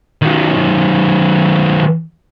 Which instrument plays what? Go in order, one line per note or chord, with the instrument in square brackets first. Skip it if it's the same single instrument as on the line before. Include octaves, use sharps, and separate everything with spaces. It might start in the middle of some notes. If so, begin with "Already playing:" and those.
[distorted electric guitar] D#3 F#3